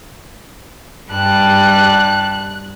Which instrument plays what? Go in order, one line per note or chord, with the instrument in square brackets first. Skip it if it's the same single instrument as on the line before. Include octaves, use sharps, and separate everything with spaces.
[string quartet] G2 G3 A5 [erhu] F#6